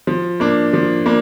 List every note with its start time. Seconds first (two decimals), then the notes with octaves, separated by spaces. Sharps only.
0.07 F3
0.40 A#3 D4
0.73 F3
1.06 A#3 D4